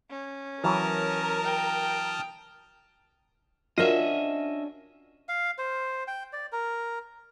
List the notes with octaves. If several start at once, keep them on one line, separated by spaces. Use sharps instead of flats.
C#4
E3 F#3 A#4 A5 D#6 F6
G5
C#4 D4 F4 F#4 A#4 D#5 E5
F5
C5
G5
D5
A#4